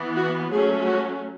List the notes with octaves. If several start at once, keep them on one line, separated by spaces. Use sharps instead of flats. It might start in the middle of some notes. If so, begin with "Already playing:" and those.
Already playing: E3 B3
F#4
F#3 A3 C#4 G#4
F#4